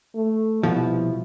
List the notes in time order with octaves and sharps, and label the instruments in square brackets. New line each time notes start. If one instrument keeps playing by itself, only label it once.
[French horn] A3
[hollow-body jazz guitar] C2 B2 F3 [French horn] E4